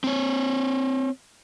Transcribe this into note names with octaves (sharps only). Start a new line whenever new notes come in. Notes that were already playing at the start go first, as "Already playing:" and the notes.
C4 C#5